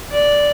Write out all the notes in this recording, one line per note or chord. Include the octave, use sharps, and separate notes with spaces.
D5